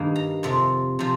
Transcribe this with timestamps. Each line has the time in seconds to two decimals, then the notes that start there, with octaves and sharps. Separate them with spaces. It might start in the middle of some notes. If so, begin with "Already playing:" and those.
Already playing: G2 D#3 A#3
0.16 A#5
0.43 F2 C3 F3
0.99 C3 F3